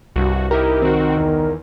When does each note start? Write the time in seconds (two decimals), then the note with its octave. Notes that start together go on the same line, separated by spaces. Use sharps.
0.16 C2 G2 F#4
0.51 D#4 E4 G4 A#4
0.82 D#3 C4 F#4
1.17 E2